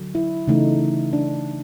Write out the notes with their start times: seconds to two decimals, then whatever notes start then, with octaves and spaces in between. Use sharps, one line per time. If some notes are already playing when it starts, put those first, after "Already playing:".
Already playing: D3 F#3
0.15 E4
0.47 C#3 E3 A3 D#4
1.13 D4